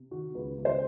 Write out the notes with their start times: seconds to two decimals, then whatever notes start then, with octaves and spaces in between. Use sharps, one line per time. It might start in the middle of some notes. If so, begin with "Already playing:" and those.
Already playing: C3
0.11 D#3 F#4
0.35 C#2 B4
0.58 C#2
0.65 C5